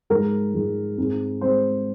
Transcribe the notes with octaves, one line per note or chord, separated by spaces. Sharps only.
G#2 F3 G#3 A#4
G#2 F3 G#3
G#2 G#3 C4 D#4
G#3 C4 C5